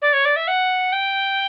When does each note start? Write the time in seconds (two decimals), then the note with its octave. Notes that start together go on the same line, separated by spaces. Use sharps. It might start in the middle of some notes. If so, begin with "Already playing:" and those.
0.02 D5
0.13 C#5
0.25 D5
0.36 E5
0.48 F#5
0.93 G5